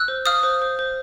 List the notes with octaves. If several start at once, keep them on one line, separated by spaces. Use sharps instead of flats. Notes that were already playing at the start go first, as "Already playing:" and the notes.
Already playing: E6 F#6
C5
F5 D#6 F6
C5
C5
C5